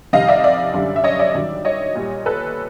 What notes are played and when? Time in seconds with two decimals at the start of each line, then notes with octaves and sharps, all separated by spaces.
0.13 F2 C3 D#3 G3 D#5 F5
0.28 D5 E5
0.44 D5 E5
0.74 F#2 D3 G3
0.96 E5
1.04 C#5 D#5
1.19 D5 E5
1.35 G2 D#3 F#3
1.65 C#5 D#5
1.95 A#2 G3
2.26 A4 B4